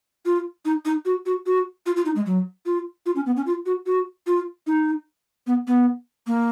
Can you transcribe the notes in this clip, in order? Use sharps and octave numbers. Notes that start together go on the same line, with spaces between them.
F4
D#4
D#4
F#4
F#4
F#4
F4
F4
D#4
G#3
F#3
F4
F4
C#4
B3
C#4
F4
F#4
F#4
F4
D#4
B3
B3
A#3